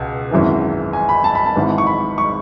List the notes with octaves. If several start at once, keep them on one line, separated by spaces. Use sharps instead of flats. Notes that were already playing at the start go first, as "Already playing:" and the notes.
Already playing: C#2 B2
G#1 F#2 E3
G#5
B5
A5
B5
A5
G#1 G#2 E3
C#6
B5
C#6